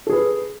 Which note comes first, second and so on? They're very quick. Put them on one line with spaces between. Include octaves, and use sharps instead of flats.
A4 G#4 B4